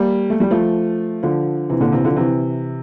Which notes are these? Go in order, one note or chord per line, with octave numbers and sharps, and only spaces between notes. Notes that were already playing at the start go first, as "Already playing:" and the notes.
Already playing: G3 A#3
A3
G3
F3 A3
D3 F3
C3 E3
A#2 D3
C3 E3
D3 F3
C3 E3